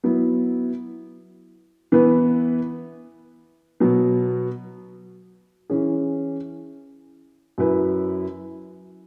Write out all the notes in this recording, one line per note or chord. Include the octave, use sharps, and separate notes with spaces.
F#3 B3 E4
E3 B3 E4 B4
B2 F#3 B3
E3 C#4 G#4
F#2 F#3 E4 B4